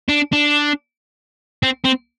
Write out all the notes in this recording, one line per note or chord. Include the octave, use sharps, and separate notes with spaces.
D4
D4
C4
C4